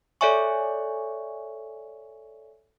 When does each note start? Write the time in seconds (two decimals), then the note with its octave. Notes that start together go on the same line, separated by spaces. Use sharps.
0.21 A4 C#5 D5 E5 G#5 C#6